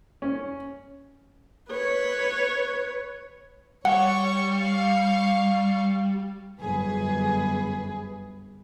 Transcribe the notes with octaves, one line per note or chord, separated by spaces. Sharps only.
C#4
B4 C#5
G3 C#5 F#5 C#6
F5 C#6
G1 F#2 G#4 B4